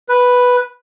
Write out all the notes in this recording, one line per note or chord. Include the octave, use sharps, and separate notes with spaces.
B4